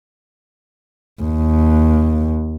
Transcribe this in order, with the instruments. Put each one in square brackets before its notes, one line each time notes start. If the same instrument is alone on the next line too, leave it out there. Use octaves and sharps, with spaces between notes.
[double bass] D#2